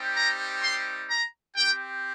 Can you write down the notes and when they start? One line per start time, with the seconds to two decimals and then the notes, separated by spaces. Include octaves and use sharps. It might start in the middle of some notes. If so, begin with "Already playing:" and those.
Already playing: G3 C4 D#4 G4
0.16 A#5
0.63 C6
1.10 A#5
1.56 C4 G4 G5